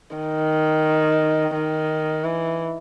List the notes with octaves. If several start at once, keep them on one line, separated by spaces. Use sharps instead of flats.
D#3
D#3
E3